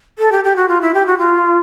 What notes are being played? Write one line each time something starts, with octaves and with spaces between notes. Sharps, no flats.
A4
G4
G4
F#4
F4
E4
G4
F#4
F4